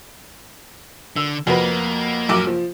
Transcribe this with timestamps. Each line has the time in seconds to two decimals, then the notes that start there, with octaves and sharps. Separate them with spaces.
1.16 D3 E6
1.47 F2 A#3 F#4 B4
2.29 A#1 F#2 D6
2.47 F3